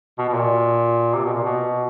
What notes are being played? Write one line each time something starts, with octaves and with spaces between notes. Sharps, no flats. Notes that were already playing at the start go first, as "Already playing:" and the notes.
B2
B2
A#2
C3
B2
A#2
B2